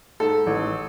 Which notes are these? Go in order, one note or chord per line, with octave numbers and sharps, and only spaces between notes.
G#2 A4
A1